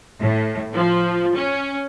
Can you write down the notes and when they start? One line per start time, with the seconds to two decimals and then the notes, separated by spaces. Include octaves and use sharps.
0.20 A2
0.75 F3
1.35 C#4